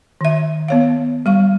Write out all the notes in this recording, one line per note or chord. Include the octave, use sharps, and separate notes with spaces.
D#3 E5
B3 C#5 F5
G3 F5 C#6